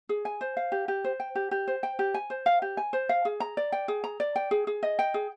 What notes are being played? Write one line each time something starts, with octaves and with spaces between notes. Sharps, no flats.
G#4
G#5
C5
F5
G4
G4
C5
G5
G4
G4
C5
G5
G4
G#5
C5
F5
G4
G#5
C5
F5
G#4
A#5
D5
G5
G#4
A#5
D5
G5
G#4
G#4
D#5
G5
G#4